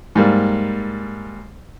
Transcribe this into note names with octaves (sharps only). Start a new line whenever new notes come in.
G#2 G3 A#3